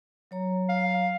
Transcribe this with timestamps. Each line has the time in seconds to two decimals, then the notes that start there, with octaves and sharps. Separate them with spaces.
0.31 F#3 C#5 A#5
0.69 F5